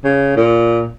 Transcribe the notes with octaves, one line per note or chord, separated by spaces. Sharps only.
C#3
A#2